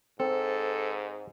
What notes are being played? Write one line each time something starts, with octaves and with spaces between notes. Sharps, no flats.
G#2 C4 A4